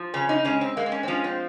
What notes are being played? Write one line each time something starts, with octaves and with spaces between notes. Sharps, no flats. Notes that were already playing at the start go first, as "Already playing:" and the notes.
Already playing: F3
C#3 C#4
D#4
G#3 C#4
C4
G#3 A#3
C4
C#4
C4
F3 C#4
C4